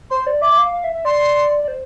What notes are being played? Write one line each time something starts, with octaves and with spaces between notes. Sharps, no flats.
C5 C6
D5
E5 D6
E5
F5
F5
E5
E5
D5 C6
D5
C5